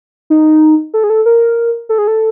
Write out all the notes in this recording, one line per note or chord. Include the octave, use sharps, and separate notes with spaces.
D#4
A4
G#4
A4
A#4
A4
G#4
A4